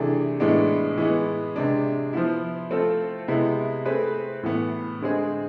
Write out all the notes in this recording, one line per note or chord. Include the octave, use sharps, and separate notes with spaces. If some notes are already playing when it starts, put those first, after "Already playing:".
Already playing: C3 E3 A3 D4 G#4
A2 E3 G#3 B3 D4
E3 G#3 B3
C3 G#3 D4
F3 B3 E4
A3 C4 F4 A4
C3 G#3 B3 E4
A3 C4 G#4 B4
A2 E3 B3
D3 G#3 C4 G#4